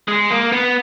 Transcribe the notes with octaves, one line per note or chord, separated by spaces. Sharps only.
G#3
A#3
B3